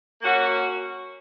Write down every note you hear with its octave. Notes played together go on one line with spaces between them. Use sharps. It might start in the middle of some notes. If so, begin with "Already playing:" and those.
A#3 C#4 F#4